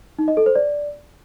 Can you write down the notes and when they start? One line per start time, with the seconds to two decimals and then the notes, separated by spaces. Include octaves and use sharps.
0.19 D#4
0.28 D#5
0.37 A4
0.46 C5
0.55 D5